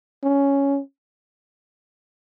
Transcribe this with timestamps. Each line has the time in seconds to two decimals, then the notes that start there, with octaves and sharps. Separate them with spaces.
0.23 C#4